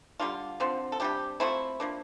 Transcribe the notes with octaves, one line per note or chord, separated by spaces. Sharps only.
D3 G3 A#3 D4 F4
D3 F3 C4
A4
C3 G3 D4 G4
F3 A3 C4 E4
F3 A#3 D4